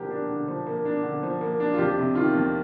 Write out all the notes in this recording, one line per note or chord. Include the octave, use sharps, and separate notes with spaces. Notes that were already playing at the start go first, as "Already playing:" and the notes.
Already playing: D3 F3 A#3 G4
D4
D3
F3
A#3
D4
D3
F3
A#3
D4
F4
F2 G4
C3
D#3 F4
F2